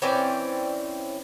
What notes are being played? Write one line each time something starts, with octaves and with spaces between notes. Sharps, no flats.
E3 C4 C#4 D5